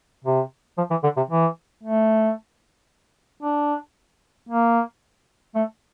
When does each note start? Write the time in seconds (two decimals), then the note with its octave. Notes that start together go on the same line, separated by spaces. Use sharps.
0.24 C3
0.78 F3
0.90 E3
1.04 D3
1.17 C3
1.30 E3
1.83 A3
3.43 D4
4.49 A#3
5.55 A3